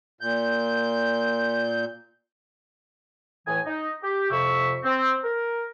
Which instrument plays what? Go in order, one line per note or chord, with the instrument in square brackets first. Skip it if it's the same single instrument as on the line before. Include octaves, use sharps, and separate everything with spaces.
[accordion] A#2 G6
[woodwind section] A2 E3 G#5
D#4
G4
F2 C3 E5 C#6
C4
A#4